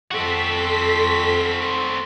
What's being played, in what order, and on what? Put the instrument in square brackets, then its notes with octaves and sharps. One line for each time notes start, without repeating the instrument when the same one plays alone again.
[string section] F2 A4 B6 [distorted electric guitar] C4 F#4